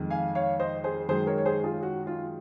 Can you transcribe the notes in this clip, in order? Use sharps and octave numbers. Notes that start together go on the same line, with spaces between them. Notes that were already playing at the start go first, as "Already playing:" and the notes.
Already playing: F2 D#3 G#3
F5 G#5
C#5 F5
C5 D#5
G#4 C5
F#2 D#3 G#3 G#4 C5
A#4 C#5
C#5
G#4 C5
F4 G#4
F#4
F4